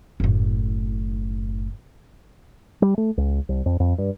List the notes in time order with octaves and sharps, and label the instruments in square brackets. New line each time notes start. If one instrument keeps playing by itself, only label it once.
[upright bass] F#1 A2
[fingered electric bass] G3
A3
C#2
C2
F2
F2
G2